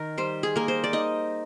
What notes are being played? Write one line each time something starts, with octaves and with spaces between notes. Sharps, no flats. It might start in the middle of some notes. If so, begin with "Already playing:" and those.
Already playing: D#3 A#4
G3 C5
G#4
A#3 A#4
C5
D5
D#4 D#5